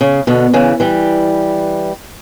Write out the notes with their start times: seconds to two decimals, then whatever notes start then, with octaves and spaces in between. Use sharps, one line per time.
0.01 C#3
0.27 B2 D3
0.54 C#3 E3
0.80 E3 G3